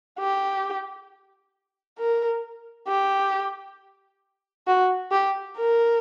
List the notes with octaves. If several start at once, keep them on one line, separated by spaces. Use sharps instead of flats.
G4
A#4
G4
F#4
G4
A#4